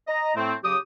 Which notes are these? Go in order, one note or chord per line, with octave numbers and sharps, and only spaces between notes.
D#5 A#5
A2 A3 C4
C#3 F#3 G4 D6 D#6